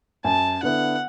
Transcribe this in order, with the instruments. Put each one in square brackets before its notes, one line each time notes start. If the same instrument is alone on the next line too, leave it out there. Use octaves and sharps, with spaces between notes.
[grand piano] F#2 [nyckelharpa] A5
[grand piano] D3 B3 E4 [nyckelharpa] F#5